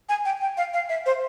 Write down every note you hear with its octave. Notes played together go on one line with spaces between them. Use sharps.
G#5
G5
G5
F5
F5
E5
C5